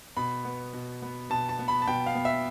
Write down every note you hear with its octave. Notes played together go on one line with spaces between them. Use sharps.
B2 B5
B3
B2
B3
B2 A5
A5
B3
B5
A5
B2 G5
F5
B3
E5